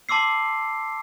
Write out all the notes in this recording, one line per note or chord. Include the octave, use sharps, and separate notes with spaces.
A5 C6 D6 E6 C7